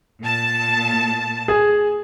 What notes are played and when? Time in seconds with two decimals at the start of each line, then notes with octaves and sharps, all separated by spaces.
0.22 A#2 A5
1.48 G#4 G#5